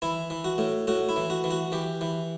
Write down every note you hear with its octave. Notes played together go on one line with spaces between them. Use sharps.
E3 E4
E3
F#4
A2
A2 F#4
E4
E3
F#4
E3
F#4
E3 G4
E3